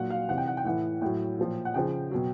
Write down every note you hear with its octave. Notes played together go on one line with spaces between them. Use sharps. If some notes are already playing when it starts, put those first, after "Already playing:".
Already playing: A#2 F#3 F#5
F5
C3 E3 F#5
G5
F#5
G5
A2 E3 F#5
A2 F#3 G5
A#2 F3
F#5
C#3 F3 G5
B2 F#3